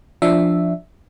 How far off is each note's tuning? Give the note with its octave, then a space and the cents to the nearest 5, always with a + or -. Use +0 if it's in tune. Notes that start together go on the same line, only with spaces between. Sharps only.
F3 -5 D4 +0 E5 +0